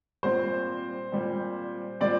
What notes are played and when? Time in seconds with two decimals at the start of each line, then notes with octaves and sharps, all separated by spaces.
0.23 A#2 G3 C4 C5
1.12 A#2 G3 C4
2.01 A#2 G3 C4 D5